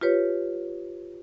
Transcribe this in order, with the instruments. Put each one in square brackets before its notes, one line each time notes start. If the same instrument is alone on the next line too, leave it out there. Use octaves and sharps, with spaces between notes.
[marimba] F4 G4 B4 C#5